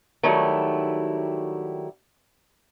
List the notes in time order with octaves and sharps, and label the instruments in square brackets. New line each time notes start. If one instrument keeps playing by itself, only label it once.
[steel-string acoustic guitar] D#3 F#3 G3 A3 E4